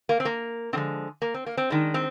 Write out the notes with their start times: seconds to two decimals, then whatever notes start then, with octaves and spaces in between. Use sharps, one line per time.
0.09 A#3
0.20 C4
0.25 A#3
0.73 D3 F3 G#3 C4
1.22 A#3
1.34 C4
1.46 A#3
1.57 C4
1.70 D#3 G#3 D4
1.94 C4